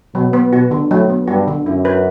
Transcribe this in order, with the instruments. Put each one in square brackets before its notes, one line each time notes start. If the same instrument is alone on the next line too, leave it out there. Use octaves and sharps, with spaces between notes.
[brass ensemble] B2 [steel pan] F#3
[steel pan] B3
[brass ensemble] B2 [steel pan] F#4
[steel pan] D3
[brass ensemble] A2 [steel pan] F#3
[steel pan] B3
[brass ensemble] G2 [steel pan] F#4
[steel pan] D3
[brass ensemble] F#2 [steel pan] E4
[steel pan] B4